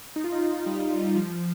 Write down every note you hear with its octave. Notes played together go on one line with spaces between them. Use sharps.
D#4
F4
D#4
F4
G3
F3